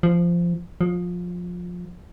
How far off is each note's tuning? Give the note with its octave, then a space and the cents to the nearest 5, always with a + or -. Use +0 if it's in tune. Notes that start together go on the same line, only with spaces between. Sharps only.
F3 -15
F3 +20